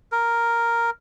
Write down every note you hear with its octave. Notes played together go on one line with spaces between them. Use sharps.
A#4